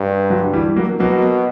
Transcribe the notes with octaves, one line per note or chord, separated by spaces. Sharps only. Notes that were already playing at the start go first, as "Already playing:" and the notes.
Already playing: G2
D3 F#3
E3 G3
F#3 A#3
B2 F#3 A#3